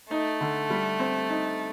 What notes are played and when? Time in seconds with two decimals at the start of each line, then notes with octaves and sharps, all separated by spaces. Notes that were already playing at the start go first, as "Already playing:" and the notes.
0.10 A3 D#4
0.41 D3
0.70 G3
0.99 C4
1.29 D#4